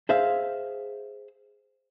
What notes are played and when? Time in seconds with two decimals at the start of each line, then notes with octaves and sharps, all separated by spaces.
0.09 G#4 C5 E5 F5